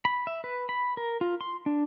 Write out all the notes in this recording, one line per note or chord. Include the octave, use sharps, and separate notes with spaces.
B5
E5
B4
B5
A#4
F4
C6
D4